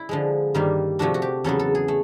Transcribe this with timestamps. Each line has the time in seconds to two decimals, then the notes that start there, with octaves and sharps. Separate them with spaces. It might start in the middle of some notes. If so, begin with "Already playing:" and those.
Already playing: E4
0.09 D3 F3 G#3
0.54 G2 D#3 G3 A#3
0.99 C3 F3 A3 D4 F#4
1.14 F#4
1.22 G4
1.44 E2 C#3 F#3 B3 A4
1.59 A4
1.75 G#4
1.88 A3